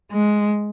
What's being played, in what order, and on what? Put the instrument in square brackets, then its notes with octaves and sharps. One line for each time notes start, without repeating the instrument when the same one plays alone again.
[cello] G#3